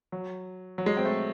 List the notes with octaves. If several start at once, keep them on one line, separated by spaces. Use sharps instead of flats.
F#3
F#3
G#3
C4
A3